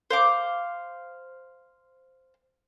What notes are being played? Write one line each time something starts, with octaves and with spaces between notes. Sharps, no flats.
C5 F5 D6